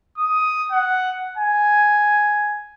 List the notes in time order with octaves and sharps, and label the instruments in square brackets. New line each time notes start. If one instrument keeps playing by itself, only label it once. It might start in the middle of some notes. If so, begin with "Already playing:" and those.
[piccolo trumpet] D#6
F#5
G#5